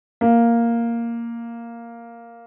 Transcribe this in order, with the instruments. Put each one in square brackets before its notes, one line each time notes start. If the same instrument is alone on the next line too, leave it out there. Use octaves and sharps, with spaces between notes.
[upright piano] A#3